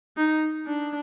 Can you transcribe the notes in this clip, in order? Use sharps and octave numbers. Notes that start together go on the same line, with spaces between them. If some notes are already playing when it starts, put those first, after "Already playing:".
D#4
D4